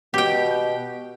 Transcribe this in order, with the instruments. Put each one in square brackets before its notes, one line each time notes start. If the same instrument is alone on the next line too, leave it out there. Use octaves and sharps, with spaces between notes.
[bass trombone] B2 [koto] G4 G5